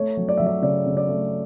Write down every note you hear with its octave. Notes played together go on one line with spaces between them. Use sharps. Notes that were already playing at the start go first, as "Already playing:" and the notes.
Already playing: A3 C#5
F#3
D5
F#3 E5
D5
C#3 D5
C#3
D5
A3